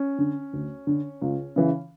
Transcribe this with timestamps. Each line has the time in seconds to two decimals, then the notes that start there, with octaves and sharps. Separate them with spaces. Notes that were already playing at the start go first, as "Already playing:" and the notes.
Already playing: C#4
0.18 D3
0.53 D2
0.87 D3
1.22 C#2
1.56 C#3 E3